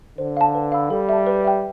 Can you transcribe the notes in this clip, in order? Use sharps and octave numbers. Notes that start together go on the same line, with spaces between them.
D3 C5
F5 A5
B4
F5 B5 E6
G3 A4
E5 A5
B4
E5 G5